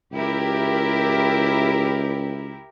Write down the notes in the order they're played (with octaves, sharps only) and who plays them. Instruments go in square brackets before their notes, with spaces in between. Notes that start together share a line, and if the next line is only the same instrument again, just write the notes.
[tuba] C#2 [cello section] E4 G4 A#4